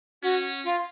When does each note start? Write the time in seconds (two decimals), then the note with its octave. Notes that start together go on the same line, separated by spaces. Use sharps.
0.22 C#4 F#4
0.64 F4